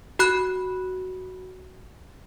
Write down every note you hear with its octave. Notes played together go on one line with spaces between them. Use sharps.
F#4 B5 F#6